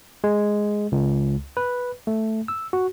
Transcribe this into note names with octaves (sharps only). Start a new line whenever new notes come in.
G#3
C#2
B4
A3
E6
F#4